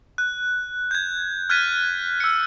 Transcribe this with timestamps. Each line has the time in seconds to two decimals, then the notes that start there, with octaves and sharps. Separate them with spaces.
0.18 F#6
0.91 G6 G#6
1.50 F6 F#6 G#6 A6 B6 D#7
2.20 E6 C#7